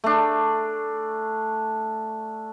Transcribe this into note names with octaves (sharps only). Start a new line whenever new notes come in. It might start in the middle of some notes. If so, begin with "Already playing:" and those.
A3 D4